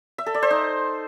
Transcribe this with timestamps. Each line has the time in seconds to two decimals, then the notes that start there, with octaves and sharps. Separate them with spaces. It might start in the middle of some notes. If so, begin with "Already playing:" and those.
0.18 E5
0.26 A4
0.34 D5
0.42 C5
0.51 D#4